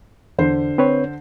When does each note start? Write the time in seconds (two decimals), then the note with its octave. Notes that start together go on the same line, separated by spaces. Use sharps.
0.39 E2 D3 C5
0.78 C4 B4 C#5